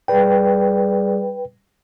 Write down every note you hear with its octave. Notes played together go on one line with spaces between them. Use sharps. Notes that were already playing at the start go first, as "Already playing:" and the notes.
G3 G#4 B4 D5 G5